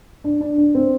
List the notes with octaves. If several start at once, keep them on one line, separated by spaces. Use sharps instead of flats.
D4
D4
D4
C4